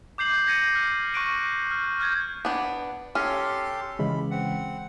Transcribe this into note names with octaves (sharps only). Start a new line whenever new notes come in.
D6 G6 C7 F#7
G6 G#6 A#6 C#7 D#7
F6
C#6 F#6 D7 D#7
F6
F6 G6 G#6
B3 D4
C#4 G4 A4 C6 F6
C#3 E3 G#3 B5
C4 F#5